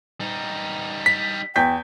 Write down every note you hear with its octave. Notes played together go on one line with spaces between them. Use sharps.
G3 D#4
B6
E2 G5 G6 B6